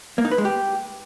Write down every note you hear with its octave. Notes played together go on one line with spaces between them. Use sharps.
A#3
D#4
B4
G#3
G4